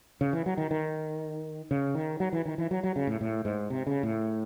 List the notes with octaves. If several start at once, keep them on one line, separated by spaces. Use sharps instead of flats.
C#3
E3
F#3
D#3
D#3
C#3
D#3
F#3
E3
D#3
E3
F#3
F#3
C#3
A2
A2
G#2
C3
C#3
A2